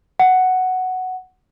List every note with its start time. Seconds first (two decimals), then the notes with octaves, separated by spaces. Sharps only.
0.20 F#5